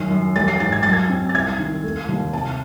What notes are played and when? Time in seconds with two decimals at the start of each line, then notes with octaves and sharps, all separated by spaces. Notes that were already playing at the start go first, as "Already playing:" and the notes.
Already playing: F#2 D#3 C7
0.10 F#2
0.36 A1 A6
0.48 C7
0.60 G#2 A6
0.72 G#6
0.83 F#2 A6
0.93 G#6
1.10 C4
1.29 A6
1.34 C2 G#6
1.59 D#3
1.84 A3
2.09 D#2
2.33 C3 A5